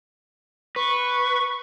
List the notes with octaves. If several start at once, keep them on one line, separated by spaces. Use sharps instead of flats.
B4 C#6